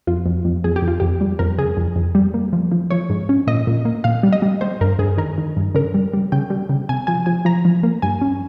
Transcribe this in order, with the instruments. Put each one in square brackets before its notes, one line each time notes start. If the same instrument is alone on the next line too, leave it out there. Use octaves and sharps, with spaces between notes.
[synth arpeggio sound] F2 F4
F2
F2
F2 G#4
G4
F2
F4
F2 G4
G3
F2 A#4
C#3 G#4
F2
F2
G3
A#3
F3
F3
F3 C#5
G#2
C#4
A#2 D#5
A#2
A#3
A#2 F5
G3
D#5
G3
G3 C5
G2 A#4
G2 G#4
D#3 A#4
D#3
G2
C#3 A#4
G3
G3
C#3 G5
G3
C#3
C3 G#5
F3 G#5
F3 G#5
F3 A#5
F3
A#3
G2 G#5
C#4